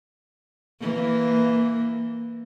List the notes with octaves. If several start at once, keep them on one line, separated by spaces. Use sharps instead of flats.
E3 A#3